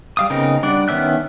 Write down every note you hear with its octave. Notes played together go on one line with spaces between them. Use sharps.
G3 F5 D#6
C#3 B3 C4 D#4 A#4
G3 D4 D5 F#5
D#3 B3 C#4 E5 F#6